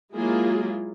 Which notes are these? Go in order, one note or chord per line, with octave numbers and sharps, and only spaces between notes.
F#3 G#3 A#3 E4 F4 G#4